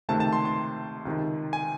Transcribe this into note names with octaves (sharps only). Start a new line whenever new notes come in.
C#2 C3 D#3 A3 C4 A5
A5
C6
C6
C#2 C3 D#3
G#5